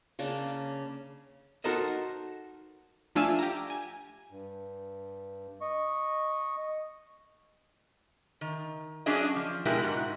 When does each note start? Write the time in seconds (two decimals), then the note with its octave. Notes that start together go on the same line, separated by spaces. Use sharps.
0.19 C#3 A#3 D4
1.64 D#4 F#4 A4 A#4 C5 D#5
3.16 F3 A3 D4 F5 G#5 E6
3.39 G4 A#5
3.70 G#5
4.31 G2
5.61 D#5 C#6
8.41 D#3
9.06 F#3 C#4 D4 G#4 D5 D#5
9.36 F3
9.65 B2 G#3 E4 G4 A#4
9.82 G#2 F#4